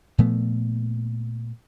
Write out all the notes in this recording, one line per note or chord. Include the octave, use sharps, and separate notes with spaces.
A#2 F3 A3 B3